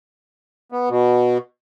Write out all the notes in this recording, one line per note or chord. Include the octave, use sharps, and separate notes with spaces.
B3
B2